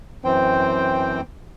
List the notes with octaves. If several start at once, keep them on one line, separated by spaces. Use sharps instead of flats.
F#2 E3 C4 C5 G5